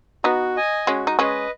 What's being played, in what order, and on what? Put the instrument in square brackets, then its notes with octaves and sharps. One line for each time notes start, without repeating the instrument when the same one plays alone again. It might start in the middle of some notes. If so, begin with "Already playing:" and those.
[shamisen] B3 D#4 [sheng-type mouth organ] F#4
[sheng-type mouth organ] D#5 G#5
[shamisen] G#3 C#4 [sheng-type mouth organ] F#4
[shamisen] D#4
[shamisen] G#3 C#4 [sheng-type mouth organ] B4 D#5